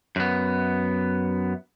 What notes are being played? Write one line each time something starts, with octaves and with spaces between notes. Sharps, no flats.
F#2 B3